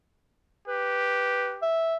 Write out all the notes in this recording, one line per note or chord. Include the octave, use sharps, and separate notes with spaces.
G4 B4
E5